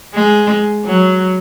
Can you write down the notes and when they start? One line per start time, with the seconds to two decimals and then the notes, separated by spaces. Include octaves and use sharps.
0.15 G#3
0.85 F#3